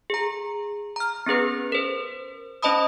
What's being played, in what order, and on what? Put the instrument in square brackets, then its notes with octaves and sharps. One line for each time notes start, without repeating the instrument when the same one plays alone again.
[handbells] G#4 A#5
A#5 F6
B3 C#4 G#4 B4
A#4 C5
C#4 C5 D#5 A5 B5 D#6